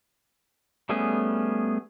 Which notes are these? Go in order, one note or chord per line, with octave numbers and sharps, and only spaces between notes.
G3 A3 B3 C#4 G#4